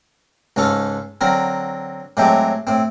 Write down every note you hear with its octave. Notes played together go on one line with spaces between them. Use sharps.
C#2 G#2 C#4 F4 A4
D3 F#3 C4 A#4
A2 F#3 G#3 A3 C4 G4
A2 C4